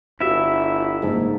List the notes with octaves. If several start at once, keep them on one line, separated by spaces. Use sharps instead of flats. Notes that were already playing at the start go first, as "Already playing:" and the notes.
G1 E4 F#4 G4 E5 F5
G#2 C#3 A3 A#3